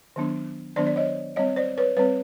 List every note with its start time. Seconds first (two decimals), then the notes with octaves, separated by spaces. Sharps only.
0.16 D#3 F#3 B3 D4
0.76 D#3 F#3 B3 D4 C5 D5
0.87 D5
0.96 C#5 D#5
1.36 G3 C4 C#5 D#5
1.56 C5 D5
1.78 B4 C#5
1.97 G3 C4 B4 C#5